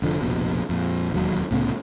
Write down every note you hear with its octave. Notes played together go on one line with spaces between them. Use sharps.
F1 D3 F3
F1 A#1 B2
F2 A#2
E1 D#2 F#3
C2 A2 C#3 B3